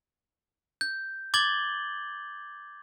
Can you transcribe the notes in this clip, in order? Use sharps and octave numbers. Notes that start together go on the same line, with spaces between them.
G6
D6 G#6 A6 F#7 G7